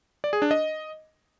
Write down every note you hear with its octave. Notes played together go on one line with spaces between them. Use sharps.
D5
G#4
D4
D#5